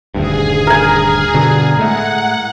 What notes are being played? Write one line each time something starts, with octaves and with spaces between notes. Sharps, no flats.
D#1 D2 G2 G#4
A#4 G#5
G2 B2 D3
A2 G#3 A3 F#5